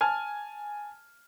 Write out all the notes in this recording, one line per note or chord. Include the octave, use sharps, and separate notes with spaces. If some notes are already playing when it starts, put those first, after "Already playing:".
G#5 A5 F6